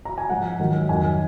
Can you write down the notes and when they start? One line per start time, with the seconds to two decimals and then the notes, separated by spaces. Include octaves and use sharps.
0.05 A#5
0.18 G#5
0.30 G#2 F3 G#3 F#5
0.59 G#2 D#3 F#3
0.89 F2 D#3 F#3 G#5